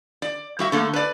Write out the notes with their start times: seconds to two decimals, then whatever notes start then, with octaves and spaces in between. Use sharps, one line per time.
0.22 D5
0.59 G3 F#4 E5
0.72 D3 A3 A#3
0.93 B4 D5